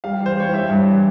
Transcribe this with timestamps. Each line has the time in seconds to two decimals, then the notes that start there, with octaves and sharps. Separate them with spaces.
0.04 G3 F5
0.21 E3
0.26 C5
0.37 G3 C#5
0.53 G3 E5
0.70 G2
0.87 E3